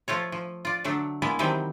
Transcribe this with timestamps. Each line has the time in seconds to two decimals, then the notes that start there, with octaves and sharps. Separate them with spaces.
0.08 F3 A3 F4 C#5
0.32 F3
0.65 F4 D5
0.84 D3 F#3 A3 D4
1.22 G#3 A#3 B3 E4
1.39 C3 D#3 E3 F#3 G3 C4